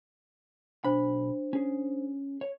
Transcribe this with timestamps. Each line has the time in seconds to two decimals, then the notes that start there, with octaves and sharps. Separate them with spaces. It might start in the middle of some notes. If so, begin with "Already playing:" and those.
0.84 B1 D4 C5 B5
1.53 C#4 G#4
2.41 C#5